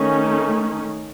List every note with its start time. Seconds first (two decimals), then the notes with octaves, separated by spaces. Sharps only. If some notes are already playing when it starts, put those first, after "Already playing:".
Already playing: D#3 A3 C#4